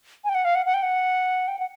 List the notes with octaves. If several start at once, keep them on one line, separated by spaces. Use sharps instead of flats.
G#5
G5
F#5
F5
F#5
F#5
G5
F#5
G5
F#5